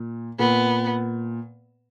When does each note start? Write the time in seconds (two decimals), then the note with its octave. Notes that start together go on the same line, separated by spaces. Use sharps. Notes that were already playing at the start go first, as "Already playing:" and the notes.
Already playing: A#2
0.39 A#2 B3